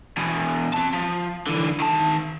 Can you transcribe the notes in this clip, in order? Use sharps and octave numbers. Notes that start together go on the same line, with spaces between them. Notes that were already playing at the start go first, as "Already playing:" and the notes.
E2 B2
C4 A5
F3
D3 E3
D#3 A5